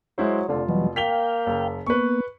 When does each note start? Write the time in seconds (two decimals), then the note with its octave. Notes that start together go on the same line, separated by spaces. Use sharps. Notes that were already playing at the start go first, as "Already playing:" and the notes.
0.18 F#3 G#3 E4 C5
0.48 F1 D3 F4
0.69 B2 E3 F#3 G3
0.96 A#3 F5 G5 B6 F7 G7
1.46 F#1
1.87 A#3 B3 B4 C#6